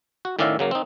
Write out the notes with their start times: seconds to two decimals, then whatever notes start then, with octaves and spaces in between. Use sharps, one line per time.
0.25 F#4
0.39 A2 D#3 C#4 D5 E5 F5
0.59 C#3 F#3 A#3
0.71 C4 D#4